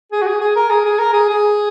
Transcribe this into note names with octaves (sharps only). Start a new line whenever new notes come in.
G#4
F#4
G#4
G#4
A#4
G#4
G#4
A#4
G#4
G#4